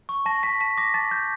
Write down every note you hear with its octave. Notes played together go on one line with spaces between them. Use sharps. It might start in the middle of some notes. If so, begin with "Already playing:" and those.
C#6
A5 A#6
A5 B6
A5 B6
D6 A#6
A5 A6
A5 G6